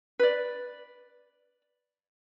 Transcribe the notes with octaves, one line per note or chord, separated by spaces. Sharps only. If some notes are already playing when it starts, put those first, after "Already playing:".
B4 D5